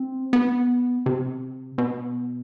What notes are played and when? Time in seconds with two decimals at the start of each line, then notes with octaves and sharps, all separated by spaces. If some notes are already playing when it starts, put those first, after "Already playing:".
Already playing: C4
0.33 B3
1.06 C3
1.78 B2